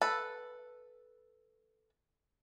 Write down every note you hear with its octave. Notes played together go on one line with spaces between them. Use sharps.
A4 B4